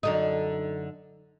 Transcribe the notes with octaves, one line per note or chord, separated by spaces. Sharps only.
F#2 D3 D#4